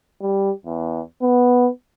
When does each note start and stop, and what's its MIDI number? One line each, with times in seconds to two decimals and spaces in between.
0.21 0.51 55
0.65 1.00 40
1.22 1.69 59